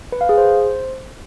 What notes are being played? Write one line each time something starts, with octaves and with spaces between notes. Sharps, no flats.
B4
F5
G#4
C5